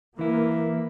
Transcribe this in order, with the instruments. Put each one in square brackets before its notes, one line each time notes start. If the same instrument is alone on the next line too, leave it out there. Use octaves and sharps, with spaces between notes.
[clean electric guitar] E3 E4 [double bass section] A#3